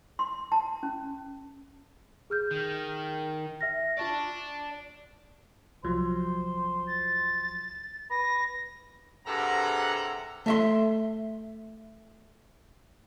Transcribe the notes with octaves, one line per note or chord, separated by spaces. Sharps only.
C6
A5
C#4
G#4 F6 G6
D#3
E5 F6 A#6
F4 D5 A5 C#6
C2 F3 F#3 C5
A6
B4 A#6
G2 C3 G#4 A4 F#5 A#5
A3 E5 C6